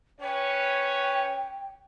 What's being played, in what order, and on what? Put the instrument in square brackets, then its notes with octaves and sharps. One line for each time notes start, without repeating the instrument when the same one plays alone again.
[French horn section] C#4 B4 C#5 [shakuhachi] G5